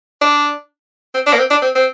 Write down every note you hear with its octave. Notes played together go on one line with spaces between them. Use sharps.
D4
C4
D4
A#3
C4
D4
C4
C4